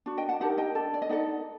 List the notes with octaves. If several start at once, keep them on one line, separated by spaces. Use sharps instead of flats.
D4 F#4
D#5 G5
F#5 A5
D#4 G4 A#4 F#5 A5
D#5 G5
D4 A4
D5
D#5
D#4 A4 D5 F#5